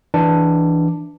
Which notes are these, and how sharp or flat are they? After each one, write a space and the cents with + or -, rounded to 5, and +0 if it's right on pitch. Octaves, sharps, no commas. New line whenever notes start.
E3 +0 D4 +0